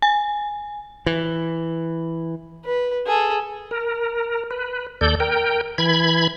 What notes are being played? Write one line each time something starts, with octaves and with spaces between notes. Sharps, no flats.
G#5
E3
B4
G#4 A4
A#4
B4
D#2 A4 D5 G6
A#4 G5
E3 B5 G#6